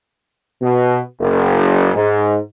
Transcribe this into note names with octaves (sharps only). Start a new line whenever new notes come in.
B2
F#1
G#2